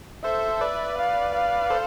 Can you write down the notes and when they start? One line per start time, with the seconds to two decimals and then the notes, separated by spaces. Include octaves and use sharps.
0.24 A4 C5 E5
0.61 B4 D5
0.98 F5
1.35 F5
1.70 A4 C5